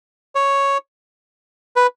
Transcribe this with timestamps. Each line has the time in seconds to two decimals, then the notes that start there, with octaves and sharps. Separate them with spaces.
0.35 C#5
1.76 B4